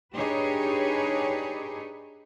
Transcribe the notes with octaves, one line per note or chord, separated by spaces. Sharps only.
D4 D#4 G4 G#4 B4 C#5